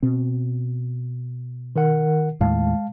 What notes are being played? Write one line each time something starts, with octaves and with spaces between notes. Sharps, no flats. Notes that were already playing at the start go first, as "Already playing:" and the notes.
B2 C4
D#3 A#4 F#5
D#2 A2 G#3 F5 A5